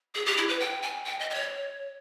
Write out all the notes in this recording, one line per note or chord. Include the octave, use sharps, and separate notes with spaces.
G#4
G4
E4
B4
G5
G#5
G5
D#5
D#5
C#5